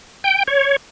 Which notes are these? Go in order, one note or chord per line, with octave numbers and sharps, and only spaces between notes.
G5
C#5